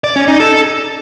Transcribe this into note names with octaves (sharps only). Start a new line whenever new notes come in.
D5
C#4
D#4
A4